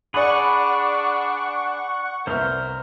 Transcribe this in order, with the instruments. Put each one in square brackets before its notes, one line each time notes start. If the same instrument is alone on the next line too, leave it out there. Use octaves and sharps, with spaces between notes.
[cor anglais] D4 [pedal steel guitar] G#4 B5 [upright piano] D5 F#6 [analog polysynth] F#5 C#6
[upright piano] C2 B3 E5 [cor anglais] A#4 [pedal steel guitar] C5 F6